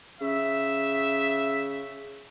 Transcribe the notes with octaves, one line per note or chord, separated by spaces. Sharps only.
C#3 E5